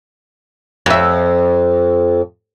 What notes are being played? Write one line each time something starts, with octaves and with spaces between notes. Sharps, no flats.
F2 E5